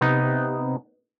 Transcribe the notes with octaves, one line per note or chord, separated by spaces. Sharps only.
C3 B3 D#4